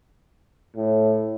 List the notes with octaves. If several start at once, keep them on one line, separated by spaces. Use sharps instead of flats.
A2